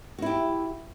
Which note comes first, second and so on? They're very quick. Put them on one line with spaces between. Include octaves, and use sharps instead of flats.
F#4 E4 G4